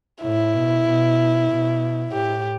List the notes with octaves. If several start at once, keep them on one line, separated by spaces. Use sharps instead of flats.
A2 E4
B2
B2
B2
A2 G4